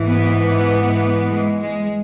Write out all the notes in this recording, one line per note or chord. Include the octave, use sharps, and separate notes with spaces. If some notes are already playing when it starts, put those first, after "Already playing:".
Already playing: G#2 E3
B3
G#3
G#3